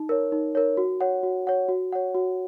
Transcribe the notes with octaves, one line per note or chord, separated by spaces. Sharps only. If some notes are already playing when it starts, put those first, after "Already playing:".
Already playing: D#4
A#4 C#5
D#4
A#4 C#5
F#4
C#5 F#5
F#4
C#5 F#5
F#4
C#5 F#5
F#4